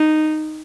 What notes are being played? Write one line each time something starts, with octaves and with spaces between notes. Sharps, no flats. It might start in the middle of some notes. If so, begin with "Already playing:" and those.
Already playing: D#4